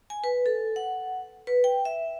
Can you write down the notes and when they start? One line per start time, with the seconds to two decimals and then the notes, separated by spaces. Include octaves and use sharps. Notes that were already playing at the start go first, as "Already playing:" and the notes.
0.10 G#5
0.24 B4
0.46 A4
0.76 F#5
1.47 B4
1.64 G5
1.85 E5